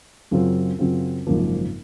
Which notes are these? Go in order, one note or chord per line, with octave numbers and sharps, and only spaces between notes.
F#2 C#3 F#3 C4 F4
F#2 C#3 F#3 C4 F4
G#1 F#2 C#3 F3 A#3